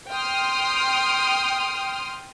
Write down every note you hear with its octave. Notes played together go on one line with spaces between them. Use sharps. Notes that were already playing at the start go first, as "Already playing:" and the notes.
G5 C6 D#6 F6